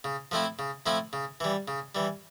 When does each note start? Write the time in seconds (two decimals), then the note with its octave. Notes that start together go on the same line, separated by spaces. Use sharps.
0.04 C#3
0.31 F3 A3 C4 E4
0.59 C#3
0.86 F3 A3 C4 E4
1.13 C#3
1.40 E3 G3
1.68 C#3
1.95 E3 G3